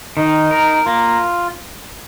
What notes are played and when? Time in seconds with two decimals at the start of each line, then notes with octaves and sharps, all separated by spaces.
0.17 D#3 D#4
0.51 A#4
0.86 A#3 F4